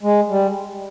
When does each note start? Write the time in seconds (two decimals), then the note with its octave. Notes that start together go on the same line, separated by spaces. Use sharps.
0.03 G#3
0.29 G3